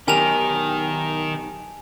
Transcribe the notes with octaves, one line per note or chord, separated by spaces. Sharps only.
B1 D#3 G4 A#4 G#5 A5 F7